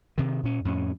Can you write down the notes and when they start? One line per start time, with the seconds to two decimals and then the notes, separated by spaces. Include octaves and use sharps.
0.18 C3 D#3
0.43 A#2 C#4
0.65 F2 A2 C#4